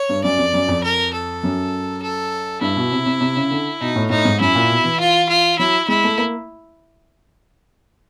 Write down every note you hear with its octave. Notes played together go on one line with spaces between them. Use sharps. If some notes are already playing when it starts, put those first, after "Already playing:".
Already playing: C#5
G2
F#2 D5
F2
F#2
F2
A#4
A4
F#2
A4
G2 E4
B2
C3
C3
C3
C#3
D3
B2 D#4
A2
A2 D#4
G#2
F#2 E4
A#2
B2
E3
F4
F4
F#3 E4
G#3 E4
A3
A#3